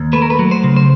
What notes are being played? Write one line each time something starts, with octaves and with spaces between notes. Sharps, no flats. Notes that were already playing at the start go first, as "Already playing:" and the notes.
Already playing: D#2
A3 B4
A#4
B4
F#3
C5
C#3
C5